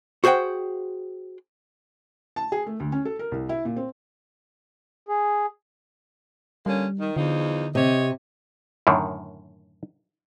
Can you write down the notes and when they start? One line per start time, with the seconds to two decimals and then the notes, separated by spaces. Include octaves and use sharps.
0.24 F#4 G#4 C5 F#5 G5
2.36 A5
2.52 G#4
2.66 A3
2.80 D2
2.92 C#4
3.05 A4
3.19 A#4
3.32 C2
3.49 E4
3.65 A#2
3.77 C4
5.09 G#4
6.66 D3 G3 A#3 C#4
6.99 D#3
7.16 E2 D3 F3 D#4
7.75 C3 C#5 D#5
8.87 F#2 A2 D3 D#3